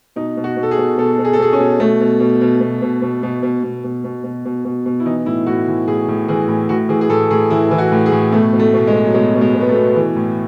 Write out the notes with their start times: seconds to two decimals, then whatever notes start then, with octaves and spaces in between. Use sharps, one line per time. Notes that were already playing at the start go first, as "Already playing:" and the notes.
0.16 B2 D#4
0.37 B2
0.44 F#4
0.57 B2
0.63 A4
0.71 G#4
0.78 B2
0.98 B2 A4
1.19 B2
1.25 G#4
1.33 A4
1.39 B2 G#4
1.53 C#4
1.59 B2
1.80 B2 A3
2.01 B2
2.20 B2
2.41 B2
2.61 B2
2.82 B2
3.02 B2
3.23 B2
3.43 B2
3.63 B2
3.84 B2
4.04 B2
4.24 B2
4.45 B2
4.65 B2
4.86 B2
5.00 E4
5.06 E3 D#4
5.26 A2 E4
5.47 A2 F#4
5.68 E3
5.88 A2 G#4
6.08 A2
6.28 E3 G#4
6.48 A2
6.69 A2 F#4
6.89 E3 G#4
7.01 G#4
7.09 A2 A4
7.31 A2 G#4
7.50 E3 E4
7.71 E3
7.78 F#4
7.92 A2
8.06 G#4
8.12 A2
8.32 B2 A3
8.53 B2
8.59 A3
8.74 B2
8.87 G#3
8.93 B2
9.04 F#3
9.14 B2 G#3
9.35 B2
9.41 G#3
9.55 B2
9.60 B3
9.69 A3
9.75 B2
9.96 E3
10.16 A2